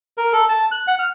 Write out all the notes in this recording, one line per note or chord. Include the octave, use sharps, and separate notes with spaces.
A#4
A4
A5
F#6
F#5
F6